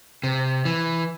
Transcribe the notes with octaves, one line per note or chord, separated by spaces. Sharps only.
C3
E3